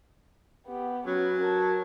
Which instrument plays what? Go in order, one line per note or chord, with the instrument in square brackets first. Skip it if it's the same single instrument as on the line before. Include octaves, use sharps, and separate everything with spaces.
[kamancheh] B3 G4
[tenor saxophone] F#3 [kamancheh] C#4 B4
[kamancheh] A#4 A5